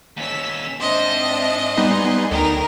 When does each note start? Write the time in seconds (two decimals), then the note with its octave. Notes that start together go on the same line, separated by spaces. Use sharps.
0.17 D#2 C#4 E6 B6
0.80 G#2 C4 D4 C5 D#5 E5
1.77 G3 B3 D#4 G#5 C6
2.31 D2 D#4 A4 A#4 G5